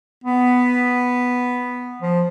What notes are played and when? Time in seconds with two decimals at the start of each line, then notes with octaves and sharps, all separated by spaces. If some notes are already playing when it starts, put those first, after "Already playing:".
0.24 B3
2.02 F3